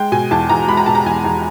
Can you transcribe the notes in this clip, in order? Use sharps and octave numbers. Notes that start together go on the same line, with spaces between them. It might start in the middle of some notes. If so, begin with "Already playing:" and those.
Already playing: G#3 G5
B2 G#5
E2 A5
E2 A#5
G#3 B5
A#5
B2 A5
A#5
E2 G#5
E2